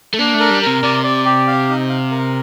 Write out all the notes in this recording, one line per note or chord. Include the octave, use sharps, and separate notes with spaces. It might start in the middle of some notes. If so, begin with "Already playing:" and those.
A3
A#3 D4
A3
A#4
G3
C3 A#4
C3 D5
D5
G4
F5
D#4
F5
A#4